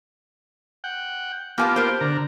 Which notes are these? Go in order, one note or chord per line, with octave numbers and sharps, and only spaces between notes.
F#5 G5
A#3 B3 F4 G4 G#5 A5
A#4 C5
D3 A#5